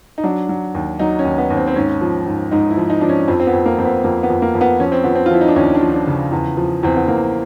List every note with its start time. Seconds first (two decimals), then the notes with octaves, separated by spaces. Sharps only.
0.18 D#4
0.24 F#3 D4
0.49 F#3
0.75 D#2
0.99 F#3 D#4
1.19 C#4
1.25 D#2
1.38 B3
1.50 D#2
1.57 C4
1.68 C4
1.75 G#2 C#4
2.01 F3
2.26 G#2
2.51 G#2 D#4
2.70 E4
2.77 F3
2.90 D#4
3.01 F3 D4
3.09 C#4
3.28 F2 C4
3.40 C4
3.47 B3
3.53 F2
3.66 A#3
3.78 F2 C4
3.85 B3
4.04 F2 A#3
4.23 B3
4.30 F2
4.42 A#3
4.55 F2
4.61 B3
4.80 F3 C#4
4.92 C4
5.04 F3 B3
5.16 C4
5.26 F4
5.31 F3 E4
5.41 D#4
5.48 D4
5.56 D#2 C#4
5.75 D4
5.81 F3
5.94 D4
6.07 C#3
6.32 E2
6.57 F3
6.83 E2 C4
6.97 B3
7.08 E2 A#3